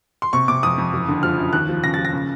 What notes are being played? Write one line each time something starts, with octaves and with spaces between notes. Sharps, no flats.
C6
C3 C#6
C3 D6
F2 D#6
F2
F#1
D3
F3 F6
F#2
D#2 F#6
F3
C#3 A#6
F3 A6
A#6
C#3